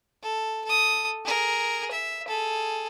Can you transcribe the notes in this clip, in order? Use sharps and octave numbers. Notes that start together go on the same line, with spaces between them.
A4
A4 D#6
G#4 A#4
E5
G#4 A4